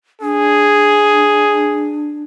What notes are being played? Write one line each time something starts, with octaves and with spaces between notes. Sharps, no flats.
D4 G#4